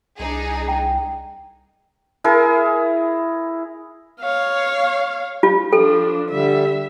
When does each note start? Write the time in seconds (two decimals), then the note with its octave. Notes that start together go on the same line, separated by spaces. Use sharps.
0.19 C2 D4 D#4 G#4
0.68 G5 A#5
2.24 E4 G#4 A#4
4.20 C#5 F5
5.43 F4
5.73 F3 D4 A4
6.30 D3 G3 E5